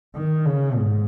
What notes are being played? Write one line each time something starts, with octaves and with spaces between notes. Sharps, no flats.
D#3
C#3
G#2